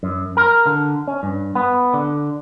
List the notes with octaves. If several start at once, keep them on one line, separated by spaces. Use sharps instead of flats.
F#2
A#4
D3
C#4
G2
B3
D3